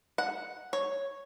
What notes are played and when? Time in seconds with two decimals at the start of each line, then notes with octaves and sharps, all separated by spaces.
0.18 F#5
0.73 C#5